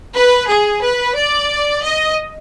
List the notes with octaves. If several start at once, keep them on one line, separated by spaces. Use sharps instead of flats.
B4
G#4
B4
D5
D#5